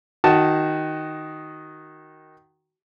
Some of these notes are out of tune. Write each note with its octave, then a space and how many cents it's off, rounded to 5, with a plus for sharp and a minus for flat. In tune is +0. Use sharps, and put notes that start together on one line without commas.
D#3 +0 F#4 +10 A5 +0